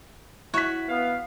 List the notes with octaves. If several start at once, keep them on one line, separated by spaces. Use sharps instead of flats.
E4 F#4 C#5 B6
B3 F5